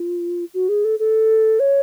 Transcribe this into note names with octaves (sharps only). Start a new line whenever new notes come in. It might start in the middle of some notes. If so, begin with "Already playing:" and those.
Already playing: F4
F#4
G#4
A4
A4
C#5